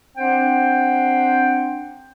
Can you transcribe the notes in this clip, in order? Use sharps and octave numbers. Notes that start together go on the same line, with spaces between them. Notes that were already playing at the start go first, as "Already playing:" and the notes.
C4 D4 C5 F#5 G5